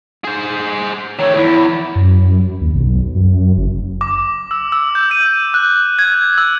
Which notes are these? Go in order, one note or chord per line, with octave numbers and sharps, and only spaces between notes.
G#4 C5
D#3 A3 C#5
E2 E4
F#2
D#2
B1
F#2
F#1
D6
E6
E6
G6
D#7
F#6
G#6
E6